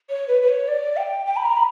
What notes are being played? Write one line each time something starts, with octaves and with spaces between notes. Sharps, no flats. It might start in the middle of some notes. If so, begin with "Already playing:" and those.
C#5
B4
B4
C#5
D5
G5
G5
B5
A#5
B5